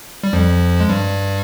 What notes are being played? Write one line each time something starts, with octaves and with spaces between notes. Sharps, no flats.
G3
F2 F3
G#3
G2 G3